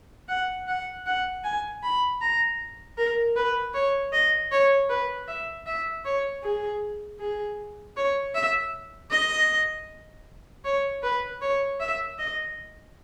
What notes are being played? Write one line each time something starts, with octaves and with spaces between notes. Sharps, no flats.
F#5
F#5
F#5
G#5
B5
A#5
A#4
B4
C#5
D#5
C#5
B4
E5
E5
C#5
G#4
G#4
C#5
E5
D#5
C#5
B4
C#5
E5
D#5